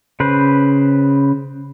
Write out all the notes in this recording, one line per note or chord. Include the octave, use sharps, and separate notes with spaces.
C#3 B4 C5